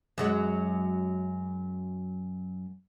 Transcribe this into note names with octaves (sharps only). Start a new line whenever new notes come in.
F#2 F#3 G#3